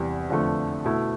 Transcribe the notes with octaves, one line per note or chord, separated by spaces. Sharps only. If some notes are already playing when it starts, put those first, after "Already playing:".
Already playing: E2 C3 G3
F2 D3 F3 A3
B2 A3 E4